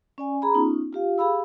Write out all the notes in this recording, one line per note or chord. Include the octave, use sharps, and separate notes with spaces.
C#4 D5 G#5
G#4 A#5 B5
B3 C#4 D#4 F4
F4 G4 F5
G4 G#4 F5 B5 E6